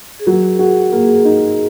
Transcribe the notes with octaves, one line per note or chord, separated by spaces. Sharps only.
G#4
F#3 A#4
F#4 G#4
A#3 G#4
D#4